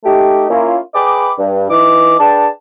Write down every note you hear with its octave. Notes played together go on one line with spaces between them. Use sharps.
A3 D#4 G4
A#3 C#4 E4 F4
G#4 B4 D#5 G5 B5 D6
G2
E3 D#4 D6
D4 G#4 B4 G5 A5